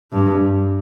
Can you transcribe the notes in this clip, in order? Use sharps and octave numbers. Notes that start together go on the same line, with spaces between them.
G2